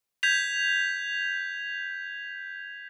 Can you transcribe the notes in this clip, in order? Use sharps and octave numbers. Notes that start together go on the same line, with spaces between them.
G6 G#6 B6 F7